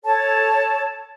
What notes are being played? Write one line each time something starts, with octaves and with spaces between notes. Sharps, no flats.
A4 C#5 A5